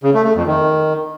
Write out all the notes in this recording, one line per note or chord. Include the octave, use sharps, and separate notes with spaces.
C#3
A3
A3
F2
D#3